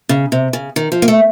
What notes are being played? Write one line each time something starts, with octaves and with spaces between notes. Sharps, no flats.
C#3
C3
C#3
D#3
F3
A#3
A3